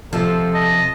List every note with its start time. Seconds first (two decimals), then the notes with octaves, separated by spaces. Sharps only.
0.13 C3 F3 A4
0.54 D#5 A5